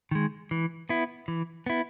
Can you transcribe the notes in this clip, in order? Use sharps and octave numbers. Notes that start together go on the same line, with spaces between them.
D#3 G#3
E3
B3 E4
E3
B3 E4